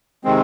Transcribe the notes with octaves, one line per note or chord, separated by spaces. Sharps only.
C3 D#3 G#3 C4